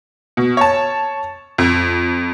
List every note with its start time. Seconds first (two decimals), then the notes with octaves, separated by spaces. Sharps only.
0.37 B2
0.57 C#5 A5
1.58 F2